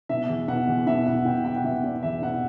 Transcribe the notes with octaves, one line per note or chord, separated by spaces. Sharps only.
B2 E5
E2
B2 F#5
E2
B2 E5
B2 F#5
B2 G5
B2 G5
F#5
B2 E5
B2 D5
E2 E5
B2 F#5